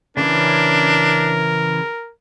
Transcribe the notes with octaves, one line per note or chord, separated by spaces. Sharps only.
C#3 E3 C#4 D4 A#4